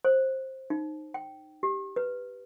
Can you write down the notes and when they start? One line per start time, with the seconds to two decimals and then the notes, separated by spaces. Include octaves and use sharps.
0.05 C5
0.70 D#4
1.14 G5
1.63 G4
1.96 B4